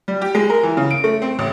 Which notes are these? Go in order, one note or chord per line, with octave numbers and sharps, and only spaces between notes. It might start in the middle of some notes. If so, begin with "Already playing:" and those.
G3
G4
G#3
A#4
E3
C#3
D7
A3
C4
A1